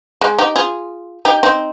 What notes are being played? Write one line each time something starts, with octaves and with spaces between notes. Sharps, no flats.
G#3
D#4 G4
F4 G#4
D#4 G4
C4 D#4